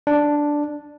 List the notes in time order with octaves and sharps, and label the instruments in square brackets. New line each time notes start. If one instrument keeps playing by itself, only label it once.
[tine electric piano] D4